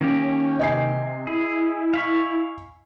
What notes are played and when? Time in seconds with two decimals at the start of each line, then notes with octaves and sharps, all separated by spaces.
0.01 D#3 A#3 C#4 G4
0.59 C3 D#5 G#5 C7
1.27 E4 G#4
1.94 F5 B5 C#6